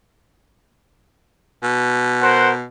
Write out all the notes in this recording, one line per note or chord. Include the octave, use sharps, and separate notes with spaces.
B2
A#4 C5 F#5